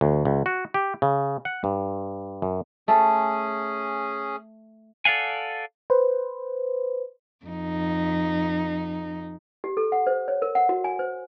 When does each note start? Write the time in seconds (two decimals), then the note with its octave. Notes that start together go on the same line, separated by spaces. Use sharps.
0.01 D2
0.25 C#2
0.46 F#4
0.74 G4
1.02 C#3
1.45 F#5
1.64 G2
2.42 F#2
2.88 A3 C#4 G#4 A4
5.05 A4 D5 F5 F#5 G#5
5.90 B4 C5
7.45 F2 D#4
9.64 G4
9.77 A4
9.92 F#5
10.07 C5
10.28 C#5
10.42 A#4
10.55 F#5
10.69 F#4
10.84 G#5
10.99 C5